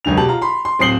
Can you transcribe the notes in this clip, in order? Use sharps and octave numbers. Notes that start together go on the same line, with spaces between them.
C#2 F#2 D3 F7
B2 G4 A5 F#7
F4 A#5
B5 C6
C6
D1 C4 D#6 C7 F#7 G7